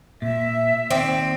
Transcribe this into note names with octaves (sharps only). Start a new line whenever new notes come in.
A#2 E5
D#2 C4 D5